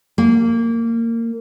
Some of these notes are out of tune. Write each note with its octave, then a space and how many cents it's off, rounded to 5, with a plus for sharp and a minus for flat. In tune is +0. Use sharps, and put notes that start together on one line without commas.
A#3 -20